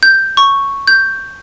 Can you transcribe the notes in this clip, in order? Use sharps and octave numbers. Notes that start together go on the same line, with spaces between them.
G6
C#6
G6